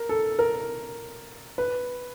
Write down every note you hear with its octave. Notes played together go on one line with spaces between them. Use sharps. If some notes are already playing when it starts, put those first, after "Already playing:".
Already playing: A#4
A4
A#4
B4